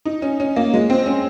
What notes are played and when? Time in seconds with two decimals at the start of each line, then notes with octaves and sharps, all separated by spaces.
0.05 D#4
0.22 C#4
0.40 C#4
0.56 A#3
0.73 G#3
0.90 C4
1.06 C#4